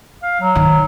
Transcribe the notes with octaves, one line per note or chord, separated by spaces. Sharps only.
F5
F#3
D#3